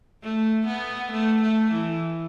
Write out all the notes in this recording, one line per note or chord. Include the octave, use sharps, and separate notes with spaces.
A3
B3
A3
A3
E3